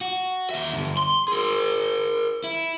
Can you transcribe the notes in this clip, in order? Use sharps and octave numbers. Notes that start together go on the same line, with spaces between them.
F#4
D#2 E5
G2 D3
C6
G#4 A#4
E4